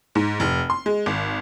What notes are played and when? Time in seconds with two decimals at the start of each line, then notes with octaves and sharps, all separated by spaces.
0.15 G#2
0.40 F1
0.70 C6
0.86 G#3
1.06 G#1